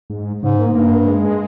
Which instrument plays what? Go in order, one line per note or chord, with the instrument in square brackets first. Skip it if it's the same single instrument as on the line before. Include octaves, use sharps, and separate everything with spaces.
[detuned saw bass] G#2
[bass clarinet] G#2 [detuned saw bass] C#3
[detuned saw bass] A#3
[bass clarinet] G2 [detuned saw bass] A#3
[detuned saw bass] G#3